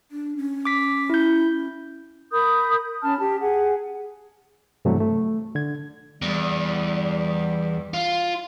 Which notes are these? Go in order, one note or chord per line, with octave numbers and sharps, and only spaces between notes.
D4
C#4
D6 B6
E4 G6
A#4 B5 D#6 G6
C#4 A5 B5 F6
G4 A5
G#4 F#5
G2 C3 E3 F#3 G3 A3
A3
D3 G#6
E2 G3
F4